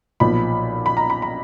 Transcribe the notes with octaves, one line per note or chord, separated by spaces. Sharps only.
B1 A#2 F3 B5
B5
A#5
B5
B5